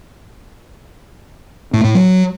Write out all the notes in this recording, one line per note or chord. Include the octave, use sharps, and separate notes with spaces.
A2
A2
F#3